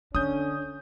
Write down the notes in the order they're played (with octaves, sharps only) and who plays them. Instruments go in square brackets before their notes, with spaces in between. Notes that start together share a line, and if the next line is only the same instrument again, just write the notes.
[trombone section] D3 C#4 [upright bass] D4 [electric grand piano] D#6 G6